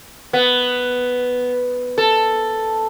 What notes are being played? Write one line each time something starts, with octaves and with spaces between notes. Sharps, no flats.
B3
A4